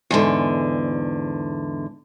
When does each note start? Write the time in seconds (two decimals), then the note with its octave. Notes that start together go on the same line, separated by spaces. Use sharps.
0.11 E2 G#2 D3